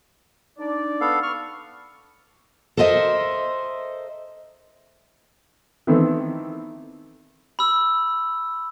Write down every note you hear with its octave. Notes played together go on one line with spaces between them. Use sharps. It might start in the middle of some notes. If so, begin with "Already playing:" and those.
D4 D#4 D5
B3 A4 F5
C#6 F6
A4 A#4 C5 D#5 E5
D#3 E3 B3 C4 A4
B5 E6